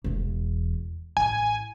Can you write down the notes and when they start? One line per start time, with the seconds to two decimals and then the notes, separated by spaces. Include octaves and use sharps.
0.04 E1 E2
1.17 A1 G#5